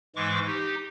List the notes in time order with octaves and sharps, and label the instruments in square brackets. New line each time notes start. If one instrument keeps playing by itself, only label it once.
[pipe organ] G#2 E3 G#3 C#6 D6
D#4 G4